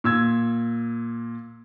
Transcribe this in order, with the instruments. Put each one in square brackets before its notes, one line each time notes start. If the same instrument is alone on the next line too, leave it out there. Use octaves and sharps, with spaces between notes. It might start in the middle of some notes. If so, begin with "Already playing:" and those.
[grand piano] A#2 E6 G#6